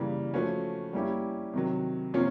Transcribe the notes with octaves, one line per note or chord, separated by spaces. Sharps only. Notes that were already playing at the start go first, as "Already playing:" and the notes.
Already playing: C#3 E3 G3 A#3
F3 A3 C#4 F#4
G3 A#3 C#4 E4 G4
C3 D#3 F#3
C3 F3 A#3 C#4 F4